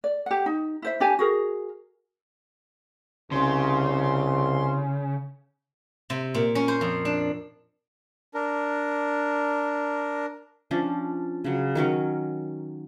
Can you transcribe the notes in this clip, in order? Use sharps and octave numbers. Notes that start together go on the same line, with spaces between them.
D5
G4 F#5
D#4
E4 C5 E5
D4 G4 G#5
F#4 G#4 A#4
C2 C#3 C6
C3
A#2
C#4
C5
F2
D4
D4 A#4
F3 C#4 D4
C#3 F#3
D#3 F#3 C#4 A#4